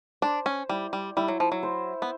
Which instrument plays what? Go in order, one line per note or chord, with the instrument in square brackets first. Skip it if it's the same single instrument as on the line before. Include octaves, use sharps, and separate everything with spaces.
[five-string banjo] D4 [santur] C5
[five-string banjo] C#4
[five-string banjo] G3 [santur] E4
[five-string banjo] G3
[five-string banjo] G3 [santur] E4
[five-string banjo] F#3
F3
F#3
[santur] C5
[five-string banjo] B3